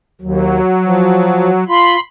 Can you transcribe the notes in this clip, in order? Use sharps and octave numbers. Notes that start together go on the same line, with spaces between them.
D#2 F#3
F3
F4 B5 C6